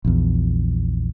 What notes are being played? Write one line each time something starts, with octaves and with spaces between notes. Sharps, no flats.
A#1 E2